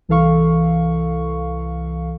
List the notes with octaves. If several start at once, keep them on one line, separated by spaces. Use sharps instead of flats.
C2 E3 A4 F5 C#6